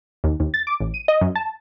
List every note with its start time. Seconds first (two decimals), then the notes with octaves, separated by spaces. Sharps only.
0.24 D#2
0.40 D#2
0.54 A6
0.67 D6
0.80 A1
0.94 D#7
1.08 D#5
1.21 F#2
1.35 A5